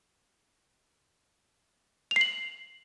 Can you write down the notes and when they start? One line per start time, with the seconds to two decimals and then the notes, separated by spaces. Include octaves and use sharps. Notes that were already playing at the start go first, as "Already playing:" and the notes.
2.11 F7
2.16 C7
2.21 F#7